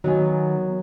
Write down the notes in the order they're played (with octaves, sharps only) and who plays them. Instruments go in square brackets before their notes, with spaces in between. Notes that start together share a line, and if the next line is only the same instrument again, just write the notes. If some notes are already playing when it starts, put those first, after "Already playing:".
[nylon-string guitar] D#3 B3 G#5 [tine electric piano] F#3